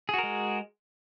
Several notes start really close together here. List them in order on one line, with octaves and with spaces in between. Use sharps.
G#4 F#4 A#4 G#3